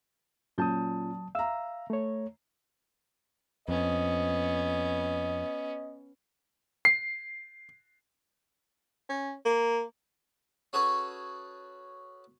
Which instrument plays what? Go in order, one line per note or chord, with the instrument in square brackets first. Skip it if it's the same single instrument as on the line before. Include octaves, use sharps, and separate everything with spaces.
[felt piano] A#2 C#4 G6 [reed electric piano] F#3 A5 D#6
[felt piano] E5 A#5 [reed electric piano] F5 E6
[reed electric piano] A3 C#5
[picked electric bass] F2 [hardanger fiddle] B3 C#4 [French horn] D#5
[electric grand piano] C7
[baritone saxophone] C#4
A#3
[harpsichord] C#4 F#4 G#4 A4 B4 C#5